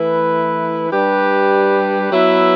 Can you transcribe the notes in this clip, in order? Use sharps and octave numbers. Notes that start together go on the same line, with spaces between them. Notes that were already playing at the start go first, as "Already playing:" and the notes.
Already playing: E3 A3 E4 B4
G3 D4 G4 B4
F#3 B3 E4 B4 E5